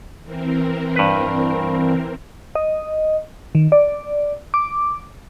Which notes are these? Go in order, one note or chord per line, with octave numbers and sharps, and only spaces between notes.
E3 C4 A#4
G2 B4
D#5
D#3
D5
D6